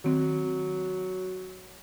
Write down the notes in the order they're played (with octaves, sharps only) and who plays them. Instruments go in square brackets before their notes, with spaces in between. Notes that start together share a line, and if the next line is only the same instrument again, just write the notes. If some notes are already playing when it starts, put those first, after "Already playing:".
[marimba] D#3 C4 [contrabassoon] F#3